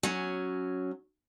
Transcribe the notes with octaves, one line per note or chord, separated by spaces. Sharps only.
F#3 C#4